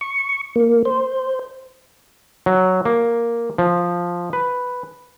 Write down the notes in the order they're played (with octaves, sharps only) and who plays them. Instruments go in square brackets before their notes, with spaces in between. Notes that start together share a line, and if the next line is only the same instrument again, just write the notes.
[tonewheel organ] C#6
A#3
C5
[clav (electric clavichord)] F#3
A#3
F3
B4